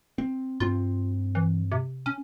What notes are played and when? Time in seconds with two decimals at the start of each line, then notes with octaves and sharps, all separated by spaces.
0.18 C4
0.60 G2 C4 F4
1.35 E3
1.72 C3
2.06 C#4